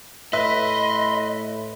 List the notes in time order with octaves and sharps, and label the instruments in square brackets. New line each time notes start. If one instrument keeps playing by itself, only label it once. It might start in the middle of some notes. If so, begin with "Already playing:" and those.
[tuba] A2 [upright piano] B4 E5 [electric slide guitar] D#5 [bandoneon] B5 C6